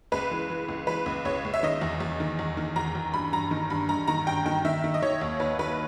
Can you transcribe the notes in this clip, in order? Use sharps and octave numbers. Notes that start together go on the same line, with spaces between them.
C#2 B4
E3
E3
C#2
E3 B4
C#2
C#2 C#5
C#2
E5
D#3 D#5
E2
E2
D#3
E2
D#3
E2 A#5
E2
G2 B5
G2 A#5
D#3
G2 B5
G2 A#5
D#3 A#5
G2 G5
D#3 G5
D#3 E5
D#3
D#5
D#3 C#5
D#2
D#2 B4
D#3 B4